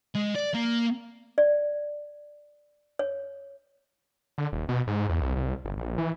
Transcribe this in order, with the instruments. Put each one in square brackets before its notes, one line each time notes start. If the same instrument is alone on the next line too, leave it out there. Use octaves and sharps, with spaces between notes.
[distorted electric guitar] G#3
D5
A#3
[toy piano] D5
C#5
[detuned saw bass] D3
D#1
B2
G#2
E2
C2
C2
G1
A#1
E3